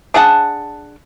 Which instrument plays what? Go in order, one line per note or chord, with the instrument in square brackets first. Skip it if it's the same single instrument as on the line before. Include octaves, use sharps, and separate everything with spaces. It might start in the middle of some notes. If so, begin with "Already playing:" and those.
[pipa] D4 G#4 F#5 A5